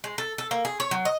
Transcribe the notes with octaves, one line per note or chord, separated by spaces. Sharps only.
G#3
A4
A4
A#3
G#4
C#5
F#3
D#5